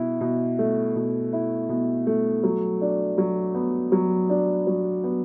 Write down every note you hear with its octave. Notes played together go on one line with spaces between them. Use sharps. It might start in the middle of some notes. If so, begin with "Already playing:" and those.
Already playing: B2 E4
B2
A3
B2
E4
B2
A3
F#3
D4
F#3
B3
F#3
D4
F#3
B3